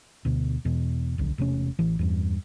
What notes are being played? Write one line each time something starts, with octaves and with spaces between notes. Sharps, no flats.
D2 B2
E2 B2
D1 B1 D3
E1 C3 A3 C#4
A1 E3
E2 G2